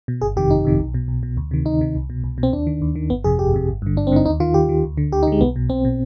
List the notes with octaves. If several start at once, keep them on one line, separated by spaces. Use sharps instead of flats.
B2
G1 G#4
F2 C3 D#3 G4
G1 D#4
F2 C3 D#3
B1
B2
B1
B2
D2
C3 D#3
D2 D#4
C3 D#3
C2
B2
C2
B2
C4
D#2 D4
D#3
D#2
D#3
G1 B3
F2 C3 G#4
G1 G4
F2 C3
G#1
G2 D3
G#1 D4
C4
G2 D3 D#4
D#2 D#4
D#3 F4
D#2 G4
D#3
D2
D3
D2 G4
D#4
D3 G#3
B1 B3
B2
B1 C4
B2